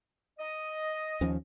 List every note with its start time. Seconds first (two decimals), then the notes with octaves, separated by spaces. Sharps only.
0.38 D#5
1.21 D#2 F3 C#4